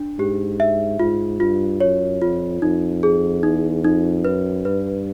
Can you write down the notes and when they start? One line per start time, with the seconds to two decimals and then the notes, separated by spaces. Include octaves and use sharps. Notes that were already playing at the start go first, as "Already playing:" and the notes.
Already playing: D4
0.19 G#2 G4
0.60 E5
1.00 G#2 F4
1.40 G2 F4
1.80 F#2 C#5
2.21 F2 F4
2.62 F2 D#4
3.03 G#4
3.43 E2 D#4
3.84 F2 D#4
4.24 F#2 B4
4.65 G2 B4